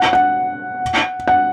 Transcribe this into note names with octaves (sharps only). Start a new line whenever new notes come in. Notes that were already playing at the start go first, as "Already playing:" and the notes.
Already playing: F#5
F#5
F#5